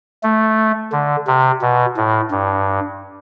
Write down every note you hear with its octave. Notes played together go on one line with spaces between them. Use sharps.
A3
D3
C3
B2
A2
G2